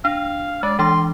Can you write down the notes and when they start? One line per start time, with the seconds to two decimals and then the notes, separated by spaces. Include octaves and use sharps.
0.05 D4 F5
0.63 G#3 D5
0.79 E3 D4 C6 D6